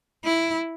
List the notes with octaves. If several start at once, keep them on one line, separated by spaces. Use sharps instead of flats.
E4